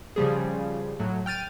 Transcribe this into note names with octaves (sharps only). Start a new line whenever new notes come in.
C#3 F3 G3 G#4
A2 F#3
G5 F6 A6 D#7